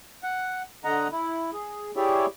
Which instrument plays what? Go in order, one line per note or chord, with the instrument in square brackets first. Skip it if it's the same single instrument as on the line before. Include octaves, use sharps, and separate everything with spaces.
[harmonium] F#5
D3 D#5 F#5 A#5
E4
G#4
E4 G4 G#4 C#5 D5 E5